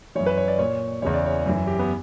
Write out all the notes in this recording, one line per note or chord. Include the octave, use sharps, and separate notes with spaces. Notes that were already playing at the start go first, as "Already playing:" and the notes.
F#2 E3 C#5
B4
C#5
D5
A#2 C#5
E2 C#3 E3 C#5
D5
C#5
F#2 E3
G4
B3